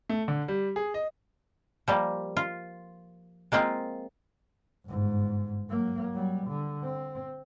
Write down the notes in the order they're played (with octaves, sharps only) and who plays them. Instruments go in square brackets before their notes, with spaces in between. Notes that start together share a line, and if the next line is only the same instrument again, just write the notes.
[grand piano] A3
D3
G3
G#4
D#5
[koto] F3 G3 A#3
F4
G#3 A#3 C4 F4
[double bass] G1 G#2
F#3 A#3
F#3 G3
D3
C4